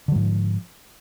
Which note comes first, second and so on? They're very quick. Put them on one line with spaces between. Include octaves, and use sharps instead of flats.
D3 F#3 G#2 F3